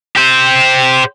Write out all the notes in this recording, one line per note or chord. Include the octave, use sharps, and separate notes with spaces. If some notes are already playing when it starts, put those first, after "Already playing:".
G4 C5